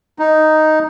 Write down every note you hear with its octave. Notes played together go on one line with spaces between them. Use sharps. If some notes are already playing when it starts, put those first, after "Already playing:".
D#4